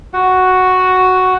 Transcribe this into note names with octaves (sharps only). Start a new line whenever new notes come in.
F#4 F#5